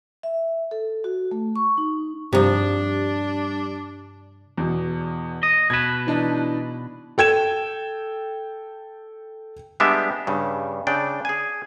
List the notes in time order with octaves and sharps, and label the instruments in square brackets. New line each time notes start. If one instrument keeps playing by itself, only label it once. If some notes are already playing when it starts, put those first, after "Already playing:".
[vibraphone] E5
A4
F#4
A3
C#6
D#4
[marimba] G2 [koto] C3 F3 [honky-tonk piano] G3 [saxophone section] D4
[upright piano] E2 B2
[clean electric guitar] D#5
[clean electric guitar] B2 B4 [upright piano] G#6 E7
[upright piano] E3 D4 D#4
[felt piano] A4 G5 G#6 E7
[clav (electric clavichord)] G3 G#3 B3 D4 G4 E5
G2 C#3 G3
C#3 D4 D5 G5
G#4 G#5